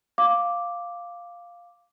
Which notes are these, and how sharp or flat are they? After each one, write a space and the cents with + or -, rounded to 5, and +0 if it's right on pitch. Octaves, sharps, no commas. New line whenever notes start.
F5 +0 D6 +0